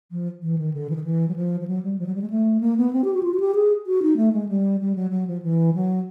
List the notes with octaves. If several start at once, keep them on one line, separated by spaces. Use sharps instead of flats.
F3
E3
D#3
D3
E3
D#3
E3
F#3
F3
F3
F#3
G3
F3
F#3
G3
G#3
A3
A#3
B3
C4
G4
F#4
F4
F#4
G4
G#4
F#4
D#4
A3
G#3
G3
G3
F#3
F#3
F3
E3
F#3